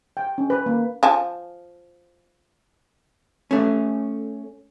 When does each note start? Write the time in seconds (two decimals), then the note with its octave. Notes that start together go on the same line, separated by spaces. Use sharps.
0.17 G5
0.38 C#4
0.50 B4
0.66 A#3
1.03 F3 G#5 A5
3.51 A3 C#4